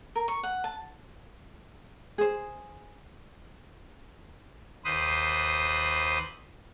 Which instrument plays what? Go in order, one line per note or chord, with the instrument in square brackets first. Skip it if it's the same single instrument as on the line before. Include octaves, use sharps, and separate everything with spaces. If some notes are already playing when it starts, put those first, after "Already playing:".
[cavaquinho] A#4
C#6
F#5
A5
[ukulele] G#4 C5
[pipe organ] D#2 B4 C5 D#6